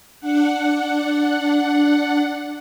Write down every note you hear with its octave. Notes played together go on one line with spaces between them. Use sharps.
D4 F#5